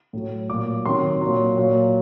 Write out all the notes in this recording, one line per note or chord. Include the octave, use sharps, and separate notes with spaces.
A2 F#3
A#2 F#3 D6
C3 D#3 F#3 C6
A#2 F#3
A#2 F#3